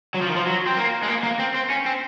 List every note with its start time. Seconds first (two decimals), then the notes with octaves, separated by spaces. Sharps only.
0.14 F#3
0.22 F3
0.29 D#3
0.36 F3
0.46 F#3
0.66 C4
0.77 A#3
1.02 G#3
1.08 A#3
1.23 A#3
1.39 C4
1.55 C4
1.70 C#4
1.86 C4